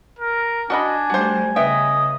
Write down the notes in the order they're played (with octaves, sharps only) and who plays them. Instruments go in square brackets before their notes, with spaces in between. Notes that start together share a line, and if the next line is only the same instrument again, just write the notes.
[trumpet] A#4
[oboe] D4 [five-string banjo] F#4 D#5 B5 [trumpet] G#5
[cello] G3 A3 [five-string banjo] F#4 C5
[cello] C#3 [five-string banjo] B3 E5 G5 [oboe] D#5